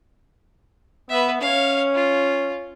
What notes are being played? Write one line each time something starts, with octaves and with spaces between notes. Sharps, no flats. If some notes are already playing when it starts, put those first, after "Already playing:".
B3 B4 E5
C#4 C#5 F5
F4